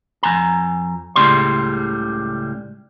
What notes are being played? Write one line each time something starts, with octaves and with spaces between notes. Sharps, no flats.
F2 E3 G#5 A#5
C#2 A2 C#3 G3 C6